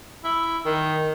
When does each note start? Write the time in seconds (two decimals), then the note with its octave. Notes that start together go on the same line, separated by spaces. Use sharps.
0.24 E4
0.65 D#3